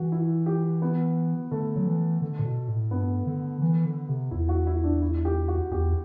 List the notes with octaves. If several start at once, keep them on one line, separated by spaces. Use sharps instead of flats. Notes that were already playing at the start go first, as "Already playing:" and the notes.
Already playing: E3 F#4
E4
G4
B3
D3 A3
F#3
E3
D3
A2
B2
A2
G2 B3
D3
E3
D3
C3
E2 E4
F#4
E4
D4
E4
G4
F#4
E2 G4